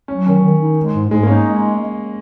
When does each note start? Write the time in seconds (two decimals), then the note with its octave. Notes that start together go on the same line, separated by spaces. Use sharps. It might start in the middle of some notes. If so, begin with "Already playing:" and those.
0.08 F#3 C#4
0.26 D#3 C#4
0.43 D#3
0.60 D#4
0.77 G#3
0.94 G#2
1.10 G#2 G#3
1.23 A#3
1.27 C#4 D#4
1.44 G#3